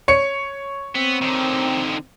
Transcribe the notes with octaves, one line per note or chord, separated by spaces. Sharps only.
C#5 C#7
B3 C4
D3 D#3